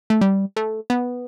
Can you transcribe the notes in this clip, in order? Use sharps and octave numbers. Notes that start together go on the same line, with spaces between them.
A3
G3
A3
B3